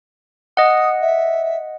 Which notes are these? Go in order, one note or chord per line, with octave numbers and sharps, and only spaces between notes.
D#5 F#5 D#6
E5